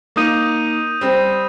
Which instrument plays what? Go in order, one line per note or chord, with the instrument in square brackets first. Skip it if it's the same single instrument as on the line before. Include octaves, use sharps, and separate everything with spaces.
[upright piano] A#3 D#4 [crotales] D#6 G6 D#7
[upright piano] G3 C4